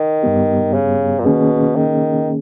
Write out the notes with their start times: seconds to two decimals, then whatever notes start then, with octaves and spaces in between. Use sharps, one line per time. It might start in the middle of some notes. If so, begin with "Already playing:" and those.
Already playing: D#3
0.23 G2 G3 B3 G4
0.74 C#3
1.19 A#2
1.25 B2 D#3 A#3 C#4 G#4
1.76 D#3